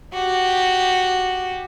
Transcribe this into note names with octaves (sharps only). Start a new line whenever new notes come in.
F#4 G4